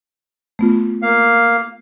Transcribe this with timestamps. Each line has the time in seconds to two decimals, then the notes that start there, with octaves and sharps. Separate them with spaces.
0.59 A3 B3 F4
1.02 A#3 F5